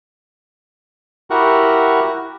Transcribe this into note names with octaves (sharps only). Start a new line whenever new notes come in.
E4 F#4 G4 A#4 F#5 C#6